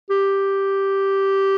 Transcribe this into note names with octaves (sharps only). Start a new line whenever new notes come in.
G4